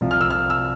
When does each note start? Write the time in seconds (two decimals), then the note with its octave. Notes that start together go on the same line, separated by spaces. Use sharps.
0.01 C2 C3 F3
0.11 F6
0.21 E6
0.30 F6
0.50 E6